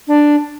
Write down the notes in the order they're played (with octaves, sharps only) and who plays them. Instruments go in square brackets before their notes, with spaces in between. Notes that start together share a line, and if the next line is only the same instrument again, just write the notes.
[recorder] D4